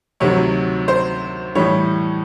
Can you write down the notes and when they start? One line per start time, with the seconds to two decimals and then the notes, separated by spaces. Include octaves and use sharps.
0.20 D2 C3 D#3 F#3 C#5
0.88 C5
1.55 A2 E3 G3 C#5